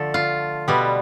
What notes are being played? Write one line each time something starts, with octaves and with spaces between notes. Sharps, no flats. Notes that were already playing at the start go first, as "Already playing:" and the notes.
Already playing: D3 F3 A3 A4
F4
B2 G3 B3